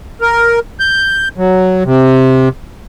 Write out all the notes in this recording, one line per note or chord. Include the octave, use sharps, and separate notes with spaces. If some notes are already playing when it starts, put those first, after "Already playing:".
A#4
G6
F#3
C3